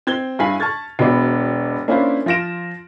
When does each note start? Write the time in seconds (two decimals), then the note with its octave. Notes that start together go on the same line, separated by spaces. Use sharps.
0.07 C4 G#6 G7
0.39 G2 E4 F5 G#5 B6 F#7
0.60 A5 C#6 F6 G#6 A6
0.99 E1 B2 B3 D5
1.88 A#3 C#4 D4 E4 F4 C5
2.26 F3 F4 A#6 D7 E7